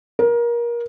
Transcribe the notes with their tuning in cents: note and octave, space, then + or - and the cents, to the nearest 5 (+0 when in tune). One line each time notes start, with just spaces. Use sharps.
A#4 +25